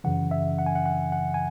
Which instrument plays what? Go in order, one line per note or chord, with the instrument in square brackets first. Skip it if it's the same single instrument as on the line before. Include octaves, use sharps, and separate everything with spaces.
[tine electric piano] F#2 C#3 E3 F#5
E5
F#5
G#5
F#5
F#5
F#5
G#5